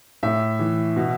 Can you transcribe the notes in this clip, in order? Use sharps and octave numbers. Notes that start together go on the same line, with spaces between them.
A2 E5
E3
B2